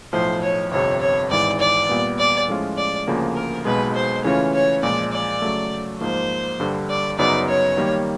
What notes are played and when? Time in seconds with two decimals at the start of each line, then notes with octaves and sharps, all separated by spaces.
0.13 B1 A2 F3 C5
0.42 C#5
0.71 G1 F2 C3 C#5
1.01 C#5
1.30 G#1 G#2 E3 D5
1.60 D5
1.89 A#2 G3 B3
2.18 D5
2.48 A2 F3 G#3 C#4 F4
2.77 D5
3.07 D2 C#3 F3 A#3
3.36 A#4
3.65 B1 B2 G#3 B4
3.95 C5
4.24 C#3 E3 A3 C#4 F4 C#5
4.54 C#5
4.83 A#2 F3 G#3 D5
5.13 D5
5.42 C#3 F#3 A3
6.01 G#2 F3 A#3 C5
6.60 G2 D3 G3
6.90 D5
7.18 F#2 C#3 F#3 B3 D#4 D5
7.48 C#5
7.77 D#3 G3 A#3